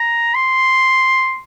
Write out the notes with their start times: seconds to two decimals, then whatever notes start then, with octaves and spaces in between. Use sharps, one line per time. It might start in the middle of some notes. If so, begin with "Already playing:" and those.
Already playing: A#5
0.35 C6